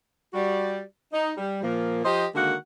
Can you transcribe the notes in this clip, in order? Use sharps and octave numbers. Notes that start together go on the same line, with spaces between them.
G3 F#4 D5
D#4
G3
A#2 F3 A#3
F3 G4 C5 D#5
D3 D#3 G#3 A#3 F#4 F#5